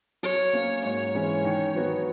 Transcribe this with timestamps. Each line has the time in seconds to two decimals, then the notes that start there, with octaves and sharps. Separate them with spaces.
0.23 F#3 C#5
0.53 A#3 C#4
0.84 G#2 C#5
1.15 E3 G#3 C#4
1.45 D#3
1.75 F#3 B3 F#4